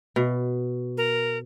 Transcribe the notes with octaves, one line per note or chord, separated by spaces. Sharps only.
B2
A#4